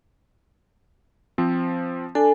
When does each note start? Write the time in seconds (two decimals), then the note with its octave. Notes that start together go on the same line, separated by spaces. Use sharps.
1.38 F3 C4
2.15 D4 A4 G#5